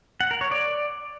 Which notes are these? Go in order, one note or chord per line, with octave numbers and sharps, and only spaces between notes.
F#5
A#4
C#5
D5